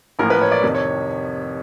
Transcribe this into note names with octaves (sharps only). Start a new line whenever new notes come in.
A1 A2 F3 A#3 A#4
B4
C#5
D5
F2 C3 D#3
C#5